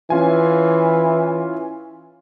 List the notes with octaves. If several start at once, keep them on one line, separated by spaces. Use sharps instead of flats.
E3 C#4 F4 G#5